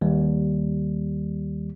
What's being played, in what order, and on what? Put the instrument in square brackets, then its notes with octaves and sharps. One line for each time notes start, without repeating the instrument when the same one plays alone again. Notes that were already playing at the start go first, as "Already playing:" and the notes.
[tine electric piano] D#2 G3